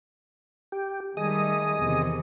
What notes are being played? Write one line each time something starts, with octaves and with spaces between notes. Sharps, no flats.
G4
D#3 G3 A3 G#4 D#5
E2 C3 D#3